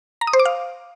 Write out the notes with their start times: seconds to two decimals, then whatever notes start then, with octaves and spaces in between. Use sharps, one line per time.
0.21 A#5
0.27 D#6
0.33 C5
0.39 D6
0.45 F5